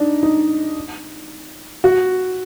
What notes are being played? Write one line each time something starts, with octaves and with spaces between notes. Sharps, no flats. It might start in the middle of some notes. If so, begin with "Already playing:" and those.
Already playing: D4 D#4
D#4
F#4